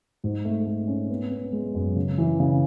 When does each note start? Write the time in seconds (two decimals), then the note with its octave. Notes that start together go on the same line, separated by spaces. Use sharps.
0.24 G#2
0.45 A3
0.66 A3
0.88 C#4
1.10 B3
1.31 B3
1.53 G#3
1.75 F#2
1.96 C#3
2.18 E3
2.40 C#3